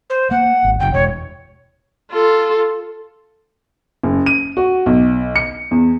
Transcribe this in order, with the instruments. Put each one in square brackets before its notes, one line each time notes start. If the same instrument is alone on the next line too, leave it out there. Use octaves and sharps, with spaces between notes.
[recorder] C5
[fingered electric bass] A#3 [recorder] F#5
[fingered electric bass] G#1
[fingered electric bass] F#1 [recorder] G5
[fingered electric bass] E1 [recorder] C#5
[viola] F4 A4
[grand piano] F#1
D#7
F#4
B1
C#7
E2